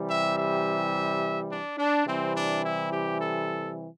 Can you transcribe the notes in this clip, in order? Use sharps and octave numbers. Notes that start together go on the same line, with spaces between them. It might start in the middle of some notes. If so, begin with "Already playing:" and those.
Already playing: C3 E3 G3
E5
E5
D4
D4
C3 E3 G3 C4
D4
E4
G4
A4